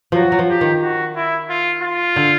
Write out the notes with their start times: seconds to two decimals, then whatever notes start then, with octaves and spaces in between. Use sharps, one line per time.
0.12 F3 F#3 F#4
0.32 F#3
0.39 F3
0.50 G4
0.61 D#3
0.82 F#4
1.16 E4
1.50 F4
1.82 F4
2.16 D3